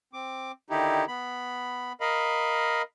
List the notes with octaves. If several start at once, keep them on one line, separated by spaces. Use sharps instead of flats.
C4 D6
D3 D#3 D#4 E4 G4
B3 B5
A#4 D#5 F5 B5